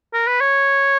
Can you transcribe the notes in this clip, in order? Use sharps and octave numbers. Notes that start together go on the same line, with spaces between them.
A#4
B4
C#5